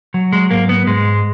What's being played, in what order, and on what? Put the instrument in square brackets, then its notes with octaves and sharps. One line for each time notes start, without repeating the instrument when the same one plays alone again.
[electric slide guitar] F#3
G#3
G#2 A#3
B3
G#2 G#3